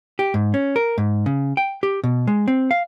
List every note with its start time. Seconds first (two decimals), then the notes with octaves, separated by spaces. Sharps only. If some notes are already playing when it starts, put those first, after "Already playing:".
0.19 G4
0.34 G#2
0.54 C#4
0.76 A#4
0.98 G#2
1.26 C#3
1.57 G5
1.83 G4
2.04 B2
2.27 G#3
2.48 C4
2.71 F5